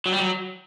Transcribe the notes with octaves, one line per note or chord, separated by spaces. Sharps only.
F#3
G3
F#3